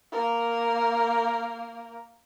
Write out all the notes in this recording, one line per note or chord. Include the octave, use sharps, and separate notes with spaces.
A#3 A#4